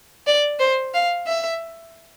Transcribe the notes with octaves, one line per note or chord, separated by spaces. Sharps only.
D5
C5
F5
E5